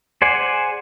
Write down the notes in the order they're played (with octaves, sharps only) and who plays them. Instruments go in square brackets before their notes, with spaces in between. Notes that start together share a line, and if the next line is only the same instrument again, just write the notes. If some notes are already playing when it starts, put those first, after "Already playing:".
[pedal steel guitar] G#4 C5 D5 F#5 G#5